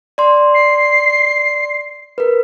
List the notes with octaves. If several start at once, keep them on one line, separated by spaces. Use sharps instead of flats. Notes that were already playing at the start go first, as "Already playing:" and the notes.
D5 C6
C7
A#4 B4